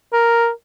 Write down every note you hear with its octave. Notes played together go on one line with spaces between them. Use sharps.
A#4